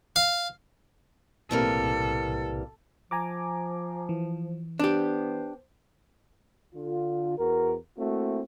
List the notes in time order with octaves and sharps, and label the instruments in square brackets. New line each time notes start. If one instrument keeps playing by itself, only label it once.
[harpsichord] F5
[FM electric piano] B1 A2 C3 [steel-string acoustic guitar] E3 G3 A#3 [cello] A4
[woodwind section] F3 [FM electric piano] G#5 A#5 D6
[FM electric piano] E3
[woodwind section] B3 C5 [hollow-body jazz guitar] D4 G4
[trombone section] D3 F4
E2 F#4 A#4
A3 A#3 C4 E4 F#4